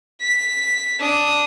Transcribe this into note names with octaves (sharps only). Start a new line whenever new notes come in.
B6
D4 D#6